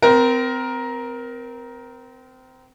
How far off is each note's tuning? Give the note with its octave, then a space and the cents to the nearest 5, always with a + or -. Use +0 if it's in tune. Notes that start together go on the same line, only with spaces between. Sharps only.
C4 -25 A#4 +15